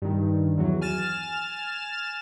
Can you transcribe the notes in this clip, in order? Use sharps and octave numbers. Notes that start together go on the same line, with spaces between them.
G2 D#3
E2 F#3
G#5 F6 A6 E7